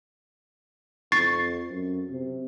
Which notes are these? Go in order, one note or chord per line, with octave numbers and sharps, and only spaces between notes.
F2 C#6 A6 C7
F#2
C3